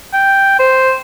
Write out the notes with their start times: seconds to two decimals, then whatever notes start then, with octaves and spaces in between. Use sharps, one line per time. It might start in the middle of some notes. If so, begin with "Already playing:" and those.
0.13 G5
0.59 C5